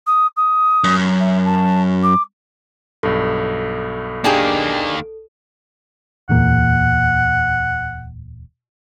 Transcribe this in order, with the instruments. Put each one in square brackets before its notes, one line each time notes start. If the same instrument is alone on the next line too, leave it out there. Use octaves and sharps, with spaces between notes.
[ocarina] D#6
D#6
[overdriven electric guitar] F#2
[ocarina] E5
A5
D6
[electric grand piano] B1 G2 [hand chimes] A4
[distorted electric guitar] D#3 A#3 [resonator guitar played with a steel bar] D4 G4 G#4
[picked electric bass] D1 E2 A#2 [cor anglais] F#5